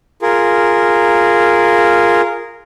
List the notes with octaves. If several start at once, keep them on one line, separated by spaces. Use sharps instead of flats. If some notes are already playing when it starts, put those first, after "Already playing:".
F4 G#4 A#4